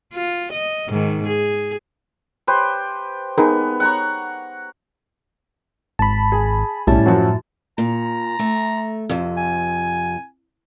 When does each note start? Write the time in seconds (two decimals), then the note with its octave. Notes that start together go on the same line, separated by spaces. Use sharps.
0.14 F4
0.52 D#5
0.88 G#2 D#3
1.27 G#4
2.47 G4 B4 C5
3.38 B3 D#4 G#4 A#4
3.80 F#5 A#5 C#6
5.99 G#1 A5 B5
6.32 G#4
6.87 B1 A2 G3 C#4 E4 A5
7.06 F#2 F3 F#3 F#4
7.78 A#2 A#5
8.39 A3
9.10 F2 C3
9.37 G#5